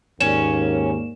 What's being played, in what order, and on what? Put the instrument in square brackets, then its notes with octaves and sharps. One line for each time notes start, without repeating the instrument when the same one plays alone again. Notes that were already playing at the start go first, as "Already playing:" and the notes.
[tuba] D#2 [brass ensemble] G#2 A#3 [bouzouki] C#4 [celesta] E7